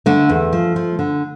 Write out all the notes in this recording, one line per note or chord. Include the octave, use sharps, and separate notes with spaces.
D3 A3
E2
F3
F3
D3